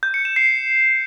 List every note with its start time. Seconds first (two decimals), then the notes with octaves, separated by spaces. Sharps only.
0.03 G6
0.14 C#7
0.25 E7
0.36 C7